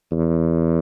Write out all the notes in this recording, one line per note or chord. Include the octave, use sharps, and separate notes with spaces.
E2